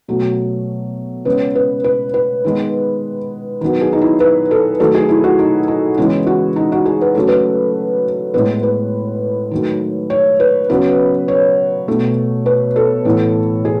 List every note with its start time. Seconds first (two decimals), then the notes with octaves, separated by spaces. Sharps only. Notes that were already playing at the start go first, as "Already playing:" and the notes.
0.08 B2 F#3 A3
1.25 C#3 G#3 B3 B4
1.55 B4
1.84 B4
2.14 B4
2.44 D#3 G#3 B3
3.61 D#3 F#3 B3
3.81 G#4
3.93 D#4
4.01 E4
4.20 B4
4.51 A4
4.80 D#3 F#3 A3 A4
4.95 G#4
5.09 E4
5.24 F#4
5.39 D#4
5.68 D#4
5.97 C#3 E3 G#3 B3 E4
6.27 F#4
6.56 D#4
6.72 F#4
6.86 G#4
7.01 B4
7.15 C#3 F#3 A3 A4
7.28 B4
8.34 A2 G#3 B3 B4
8.63 B4
9.51 D#3 F#3 A3
10.10 C#5
10.40 B4
10.69 C#3 F#3 B3 B4
11.28 C#5
11.88 B2 A3
12.46 B4
12.76 A4
13.05 A2 E3 B3
13.65 G#4